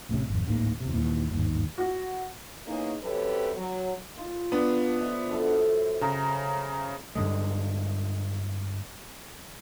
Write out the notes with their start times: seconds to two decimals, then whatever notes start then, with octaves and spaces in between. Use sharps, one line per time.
0.09 A1 A2 C3 C#4
0.28 G#1 F2
0.46 D1 A1 G#2 A#3
0.80 E2 C3
0.93 D#2 A#2 E3
1.29 G1 D#2 G#2
1.78 F#4
2.66 A#3 B3 C#4 D#4 E4 G#4
3.03 F#2 C4 G4 A4 B4 C#5
3.57 F#3
4.18 F4
4.52 B3 D4
4.96 F3 E5
5.30 F#2 A4
6.01 C#3 A#5
7.15 G2 D3 G#3